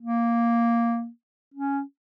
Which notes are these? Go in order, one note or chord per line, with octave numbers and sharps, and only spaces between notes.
A#3
C#4